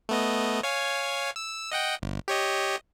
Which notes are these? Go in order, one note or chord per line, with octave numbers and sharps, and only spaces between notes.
A3 B3 D#5
C#5 F5 G#5
E6
D#5 F#5 G5
G1
G4 C#5 D#5